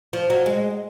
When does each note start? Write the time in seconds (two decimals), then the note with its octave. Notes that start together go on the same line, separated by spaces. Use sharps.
0.13 F3
0.30 F#3
0.46 G#3